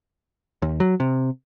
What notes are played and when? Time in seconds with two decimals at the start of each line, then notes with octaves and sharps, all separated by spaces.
0.62 D#2
0.80 F#3
1.00 C3